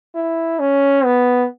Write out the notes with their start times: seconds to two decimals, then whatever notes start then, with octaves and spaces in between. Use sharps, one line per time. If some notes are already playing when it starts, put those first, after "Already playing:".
0.15 E4
0.60 C#4
1.05 B3